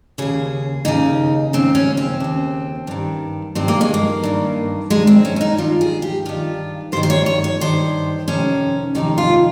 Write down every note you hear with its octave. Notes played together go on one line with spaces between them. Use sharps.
D#2 C#3 G#4
D#2 C#3 D#4
D#2 C#3 C4
C#4
C4
D#2 C#3
G2 D#3
G2 D#3 C4
A#3
G#3
A#3
G2 D#3
G2 D#3 G#3
C4
C#4
C#4
D#4
G2 D#3 F4
G#4
G4
G2 D#3 F4
G2 D#3 C5
C5
C#5
C#5
C#5
G2 D#3 C5
F2 C3 D#3 C#4
F2 C3 D#3 D#4
F4